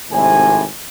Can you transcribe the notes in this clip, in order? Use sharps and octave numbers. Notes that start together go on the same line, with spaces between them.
G#1 A2 C3 G#5